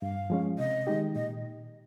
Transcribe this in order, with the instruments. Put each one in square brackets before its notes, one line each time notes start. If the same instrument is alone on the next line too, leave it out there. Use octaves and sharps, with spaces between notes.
[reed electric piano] G2 [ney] F5
[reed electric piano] F3 G#3 C#4
[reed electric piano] C3 [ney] D#5
[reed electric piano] D#3 G#3 D#4 G4
[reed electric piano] A#2 [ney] D#5